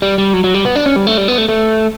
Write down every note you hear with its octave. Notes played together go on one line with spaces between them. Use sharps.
G3
G3
F#3
F#3
G3
B3
D4
C#4
G3
A3
G3
B3
A3
A3